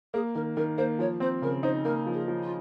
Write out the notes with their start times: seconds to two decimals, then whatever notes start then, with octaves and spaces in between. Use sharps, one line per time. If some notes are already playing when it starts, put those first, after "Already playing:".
0.14 A#3 G#4
0.34 D#3 A#4
0.56 D#3 A#4
0.77 A#3 C5
0.99 F3 C#5
1.20 C4 C5
1.42 C#3 A#4
1.63 D#4 C5
1.85 A#3 A#4
2.07 F3
2.13 G#4
2.28 F3
2.42 F4